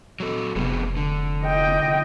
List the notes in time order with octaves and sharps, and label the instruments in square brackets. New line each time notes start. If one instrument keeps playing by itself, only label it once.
[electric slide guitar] F#3 A4
[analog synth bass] F1 [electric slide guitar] C3 B3 G#4
[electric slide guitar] D3
[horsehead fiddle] D#5 G5